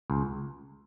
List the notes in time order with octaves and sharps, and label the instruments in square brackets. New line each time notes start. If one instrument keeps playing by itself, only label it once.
[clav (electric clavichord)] C#2